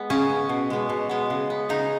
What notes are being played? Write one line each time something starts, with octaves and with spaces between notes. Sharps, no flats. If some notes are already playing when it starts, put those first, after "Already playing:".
Already playing: G#3 B3
C#3 C#4
B3
B2
G#3 B3
B2
G#3 B3
C#3
B3
C#3 D#4